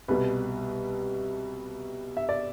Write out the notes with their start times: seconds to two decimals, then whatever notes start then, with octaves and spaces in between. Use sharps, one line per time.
0.08 C2 B2 G3 B4
2.17 E5
2.29 D5